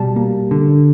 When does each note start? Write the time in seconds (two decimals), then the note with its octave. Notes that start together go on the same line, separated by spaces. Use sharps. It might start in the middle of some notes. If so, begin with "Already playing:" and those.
Already playing: B2 G3 A5
0.16 A#3
0.51 D3